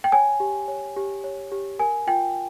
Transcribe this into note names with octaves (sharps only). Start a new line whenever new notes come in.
G5
C#5 G#5
G4
C#5
G4
C#5
G4
A#4 G#5
F4 G5